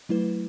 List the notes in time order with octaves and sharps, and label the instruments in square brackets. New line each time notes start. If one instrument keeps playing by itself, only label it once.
[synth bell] F#3 A3 E4 B4